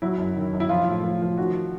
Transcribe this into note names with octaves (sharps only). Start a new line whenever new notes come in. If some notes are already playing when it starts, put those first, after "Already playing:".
F#3 E4
F#2
D#3
F#2
E4
F3 F4
A2
F3
F3
D#3 F#4